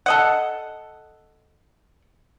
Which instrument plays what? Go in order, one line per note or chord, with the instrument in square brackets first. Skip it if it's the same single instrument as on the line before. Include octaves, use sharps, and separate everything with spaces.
[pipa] A4 D#5 F#5